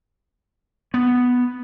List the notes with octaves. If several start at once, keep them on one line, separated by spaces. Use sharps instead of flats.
B3